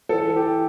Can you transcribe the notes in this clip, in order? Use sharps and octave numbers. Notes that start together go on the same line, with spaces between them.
E3 A4
E3 G4